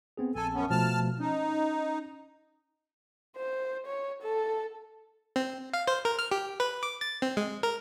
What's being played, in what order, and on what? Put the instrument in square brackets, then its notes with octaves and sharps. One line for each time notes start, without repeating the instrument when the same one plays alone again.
[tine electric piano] B3 C4 G#4
[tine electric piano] A#1 A5 [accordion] A4 G#5
[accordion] F#2 B3 C#4
[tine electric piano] B2 F3 A3 [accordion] A5 F6
[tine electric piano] C#4 [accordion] D#4
[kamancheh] C5
C#5
A4
[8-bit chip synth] C4
F5
C5
A#4
F6
G4
B4
D6
A6
C4
G#3
A#4